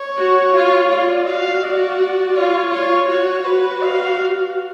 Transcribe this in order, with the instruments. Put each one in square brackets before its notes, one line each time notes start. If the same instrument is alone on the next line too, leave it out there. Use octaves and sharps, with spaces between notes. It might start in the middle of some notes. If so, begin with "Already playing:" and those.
Already playing: [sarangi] C#5
[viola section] F#4
F4
[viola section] F4 [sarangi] D5
[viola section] F#4 [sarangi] F5
[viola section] F#4 [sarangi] D5
[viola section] F4 [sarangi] C#5
[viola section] F4 [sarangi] C#5
[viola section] F#4 [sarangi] C#5
[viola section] F#4 [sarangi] B4
[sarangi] F5